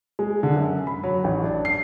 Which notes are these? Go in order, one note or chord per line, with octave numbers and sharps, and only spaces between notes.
G#3
D3
F#2
B5
F#3
A1
D4
C7